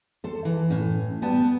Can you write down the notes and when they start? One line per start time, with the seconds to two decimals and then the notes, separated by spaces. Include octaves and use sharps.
0.24 A4 C5
0.45 E3
0.70 A2 C#4
1.22 G3 B3 A5